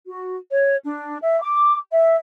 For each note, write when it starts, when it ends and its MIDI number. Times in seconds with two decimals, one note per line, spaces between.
0.06 0.36 66
0.51 0.77 73
0.85 1.18 62
1.22 1.39 76
1.41 1.75 86
1.92 2.16 76